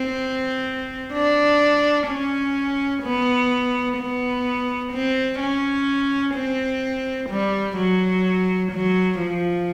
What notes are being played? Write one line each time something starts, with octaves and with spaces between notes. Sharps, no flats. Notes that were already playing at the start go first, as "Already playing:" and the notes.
Already playing: C4
D4
C#4
B3
B3
C4
C#4
C4
G3
F#3
F#3
F3